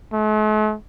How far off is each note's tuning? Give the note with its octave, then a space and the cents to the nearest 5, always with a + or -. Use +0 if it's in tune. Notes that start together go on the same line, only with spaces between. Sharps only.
A3 -45